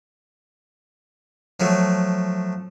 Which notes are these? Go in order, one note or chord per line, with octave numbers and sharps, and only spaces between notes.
F3 F#3 A3